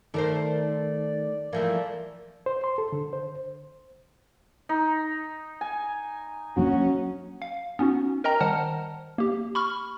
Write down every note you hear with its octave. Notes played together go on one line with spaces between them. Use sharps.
D#3 A3 A#4 C5 D5
E3 F3 A3 A#3
C5
C6
A4
D3
C5
D#4
G#5
F#3 A#3 C#4 D4 F#4
F5
B3 C#4 D#4 F#4
A#4 D#5 G5 A#5
D#3 G3 C5 F#5 A5 F6
A#3 G4
B5 C#6 F6